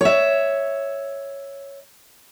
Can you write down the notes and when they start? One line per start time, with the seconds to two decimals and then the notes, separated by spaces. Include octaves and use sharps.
0.01 C#5 E5